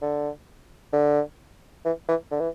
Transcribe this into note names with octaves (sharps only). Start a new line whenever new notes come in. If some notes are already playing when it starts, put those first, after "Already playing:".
D3
D3
E3
E3
D3
E3